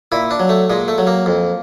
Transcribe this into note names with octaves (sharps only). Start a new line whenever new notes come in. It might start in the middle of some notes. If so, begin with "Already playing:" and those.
A#2 E4
D4
F#3
A3
A#2 G#3
A3
F#3
A#3
F2